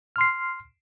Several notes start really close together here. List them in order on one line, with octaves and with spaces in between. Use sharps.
F6 C6 C7